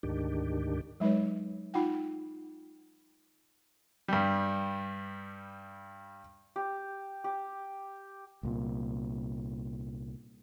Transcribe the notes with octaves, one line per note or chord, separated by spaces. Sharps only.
D2 G#2 D#3 D4 G4
F#3 G#3 D#4 B4 C#5
D#4 F4 F#5 G5
G2 G3
G4
G4
C2 A#2